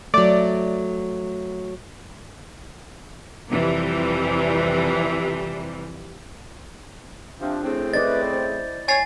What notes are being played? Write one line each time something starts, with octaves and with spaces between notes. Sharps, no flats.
F#3 A3 D5
F2 C3 E3 G3
C3 F3 D4
A2 C#3 C4
E4 B4 D5 D#5 A6
C5
C#5 G#5 A6 C7